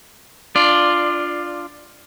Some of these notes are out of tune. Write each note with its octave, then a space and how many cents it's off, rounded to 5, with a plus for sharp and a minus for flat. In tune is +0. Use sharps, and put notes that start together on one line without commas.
D4 +0 F4 +0 D5 +15